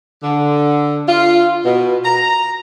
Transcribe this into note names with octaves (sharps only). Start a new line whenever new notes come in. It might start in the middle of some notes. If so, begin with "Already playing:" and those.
D3
F4
B2
A#5